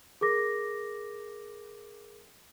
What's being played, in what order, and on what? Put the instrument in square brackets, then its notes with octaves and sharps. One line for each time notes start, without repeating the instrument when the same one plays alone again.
[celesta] G#4 A#4 D6 A#6